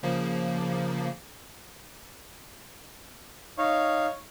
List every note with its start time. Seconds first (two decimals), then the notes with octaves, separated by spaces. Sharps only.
0.03 C#3 F3 A#3
3.58 D#4 C#5 F5